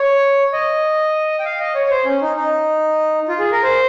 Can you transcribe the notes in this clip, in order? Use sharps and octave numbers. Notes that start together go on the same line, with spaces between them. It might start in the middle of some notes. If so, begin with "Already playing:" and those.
Already playing: C#5
D#5
G5
F5
D#5
C#5
C#5
C5
C#4
D#4
D#4
F4
G#4
A#4
C5